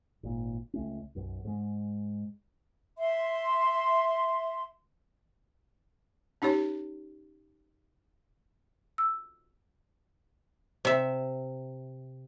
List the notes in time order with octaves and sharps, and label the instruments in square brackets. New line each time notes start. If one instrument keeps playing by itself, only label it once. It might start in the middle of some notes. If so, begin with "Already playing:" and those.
[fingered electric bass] G#1 A#2
C#2 A3 C#4
B1 F#2
G#2 G#3
[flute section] E5 C6
[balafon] C#4 D#4 G4 C#5
[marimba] E6
[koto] C3 E5